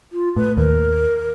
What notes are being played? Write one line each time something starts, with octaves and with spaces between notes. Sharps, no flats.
F4
A2 B4
D#2 A#4